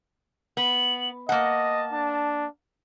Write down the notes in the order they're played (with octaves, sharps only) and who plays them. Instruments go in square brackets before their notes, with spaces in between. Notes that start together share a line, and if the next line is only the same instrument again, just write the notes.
[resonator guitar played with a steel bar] B3 [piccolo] F#7
[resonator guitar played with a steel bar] A#3 F#5 [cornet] D#5 [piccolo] A5
[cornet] D4